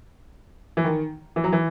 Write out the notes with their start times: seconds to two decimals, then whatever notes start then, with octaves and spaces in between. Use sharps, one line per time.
0.77 E3
0.84 D#3
1.36 E3
1.44 F#3
1.52 E3